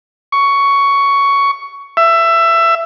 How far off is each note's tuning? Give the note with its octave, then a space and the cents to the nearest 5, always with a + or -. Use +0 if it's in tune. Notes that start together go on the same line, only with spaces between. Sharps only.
C#6 +10
E5 +20